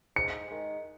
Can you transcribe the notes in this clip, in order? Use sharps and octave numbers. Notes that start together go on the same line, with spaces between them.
G#2 C#7
D#3 G#3